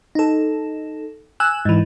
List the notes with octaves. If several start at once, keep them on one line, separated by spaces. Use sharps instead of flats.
D#4 A4
G#5 E6 F#6
G#2 E3